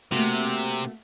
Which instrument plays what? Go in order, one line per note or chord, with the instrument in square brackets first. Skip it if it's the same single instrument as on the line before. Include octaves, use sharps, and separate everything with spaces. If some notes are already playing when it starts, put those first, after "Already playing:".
[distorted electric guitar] C3 [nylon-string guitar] A3 A#3 F#4